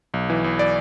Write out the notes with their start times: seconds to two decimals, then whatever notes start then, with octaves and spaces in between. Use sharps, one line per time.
0.14 B1
0.30 E3
0.44 B1
0.59 D5